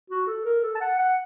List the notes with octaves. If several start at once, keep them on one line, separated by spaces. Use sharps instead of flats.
F#4
A4
A#4
A4
A5
F#5
F#5